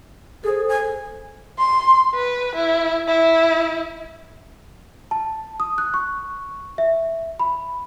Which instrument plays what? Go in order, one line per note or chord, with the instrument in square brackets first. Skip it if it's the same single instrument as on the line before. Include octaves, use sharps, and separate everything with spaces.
[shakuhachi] G#4 [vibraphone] A4 C5
[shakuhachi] G#5
[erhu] C6
B4
E4
E4
[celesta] A5
D#6
F#6
C#6
E5
B5